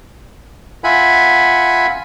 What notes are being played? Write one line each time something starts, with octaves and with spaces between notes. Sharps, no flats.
F4 E5 F#5 G#5 B5